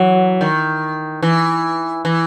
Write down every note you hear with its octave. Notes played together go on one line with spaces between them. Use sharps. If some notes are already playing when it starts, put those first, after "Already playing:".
Already playing: E3 F#3
D#3
E3
E3